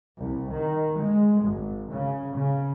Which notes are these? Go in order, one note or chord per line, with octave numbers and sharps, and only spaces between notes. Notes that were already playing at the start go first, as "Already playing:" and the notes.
C2
D#3
G#3
G#1
C#3
C#3